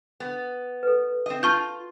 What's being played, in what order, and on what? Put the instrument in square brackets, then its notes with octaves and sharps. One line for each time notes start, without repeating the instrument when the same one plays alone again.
[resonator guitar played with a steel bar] B3
[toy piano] A4 B4
[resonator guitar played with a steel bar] C4 D#5
[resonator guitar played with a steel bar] F4 [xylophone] A5 C#6 G6